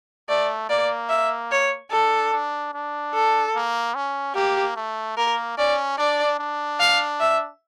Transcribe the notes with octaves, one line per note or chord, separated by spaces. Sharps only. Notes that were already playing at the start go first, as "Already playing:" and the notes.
A3 D5
A#3 D5
E5
C#5
D4 A4
D4
D4
A4
A#3
C#4
A#3 G4
A3
A#3 A#4
C#4 D5
D4 D5
D4
F5
E5